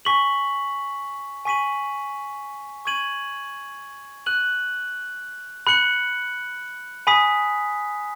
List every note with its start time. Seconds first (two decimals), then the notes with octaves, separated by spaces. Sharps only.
0.05 G#5 C#6 B6 F#7
1.45 G#5 C#6 B6 D#7 F#7
2.85 C#6 G#6 D#7 F#7
4.26 F#6 D#7 F#7
5.67 B5 F#6 C#7 F#7
7.07 G#5 B5 D#6 B6